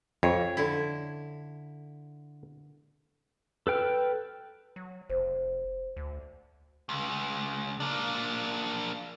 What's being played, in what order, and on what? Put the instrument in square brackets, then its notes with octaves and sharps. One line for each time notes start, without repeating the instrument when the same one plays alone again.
[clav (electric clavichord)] F2 [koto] C#5
[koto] D3 E4
[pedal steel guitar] A4 B4 G5 F6
[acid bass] F#3
[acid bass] F1 [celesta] C5
[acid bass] D2
[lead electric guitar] C#2
A#3 D4